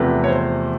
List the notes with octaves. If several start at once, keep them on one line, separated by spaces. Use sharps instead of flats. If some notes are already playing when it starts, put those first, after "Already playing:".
Already playing: E2 C3 F3 A3 B4
C#5
C5